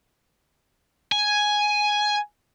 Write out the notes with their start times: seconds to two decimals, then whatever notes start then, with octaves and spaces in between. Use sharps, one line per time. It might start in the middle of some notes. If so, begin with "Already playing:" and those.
1.12 G#5